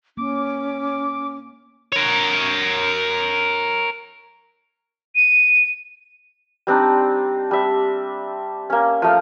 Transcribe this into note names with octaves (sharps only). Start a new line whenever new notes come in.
A#3 C#4 D6
A#4 C#5
D#7
G3 C4 D4 D#4
G3 E5
A#3 C#4
F3 A3 F5